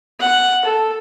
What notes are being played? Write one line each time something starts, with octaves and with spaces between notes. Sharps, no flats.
F#5
A4